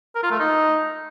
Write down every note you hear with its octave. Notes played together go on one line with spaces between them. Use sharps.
A#4
F4
A3
D#4